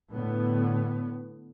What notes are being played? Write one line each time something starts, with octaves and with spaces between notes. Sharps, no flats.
A2 D3 B3